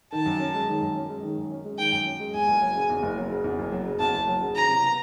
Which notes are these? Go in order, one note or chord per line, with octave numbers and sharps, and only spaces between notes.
D#3 A5
F#2
C#4
G#3
D#3
F#2
C#4
G#3
D#3
F#2
C#4
G#3
D#3 G5
F#2
C#4
G#3
E2 G#5
F#1
F#3
C#3
E2
F#1
F#3
C#3
E2
F#1
F#3
C#3
E2 A5
F#1
F#3
C#3
E3 A#5
C3
B3